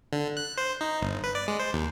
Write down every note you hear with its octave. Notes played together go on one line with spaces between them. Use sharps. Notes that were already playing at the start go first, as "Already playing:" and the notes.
D3
F#6
C5
D#4
G1
B4
D5
G#3
C5
D#2